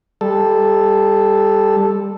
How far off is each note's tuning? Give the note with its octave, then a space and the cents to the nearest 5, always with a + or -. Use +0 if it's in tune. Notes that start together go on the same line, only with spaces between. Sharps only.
G3 +20 A4 +0